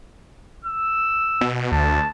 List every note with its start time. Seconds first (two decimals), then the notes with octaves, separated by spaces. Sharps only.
0.65 E6
1.41 B2
1.72 D2 A5